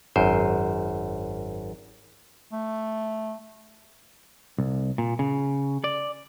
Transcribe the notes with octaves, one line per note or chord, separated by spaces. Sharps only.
G#1 F#2 C5
A3
C2
A#2
C#3
D5